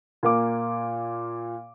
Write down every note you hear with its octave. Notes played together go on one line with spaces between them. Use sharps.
A#2 A#3 D6